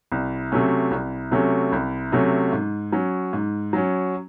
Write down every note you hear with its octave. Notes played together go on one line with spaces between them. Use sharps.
C2
C3 F#3 A3 C#4
C2
C3 F#3 A3 C#4
C2
C3 F#3 A3 C#4
G#2
F#3 C#4
G#2
F#3 C#4